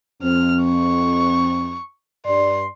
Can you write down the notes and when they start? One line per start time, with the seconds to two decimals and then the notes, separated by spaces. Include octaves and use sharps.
0.23 F2 C4 F6
0.65 C#6
2.26 G2 D5 C6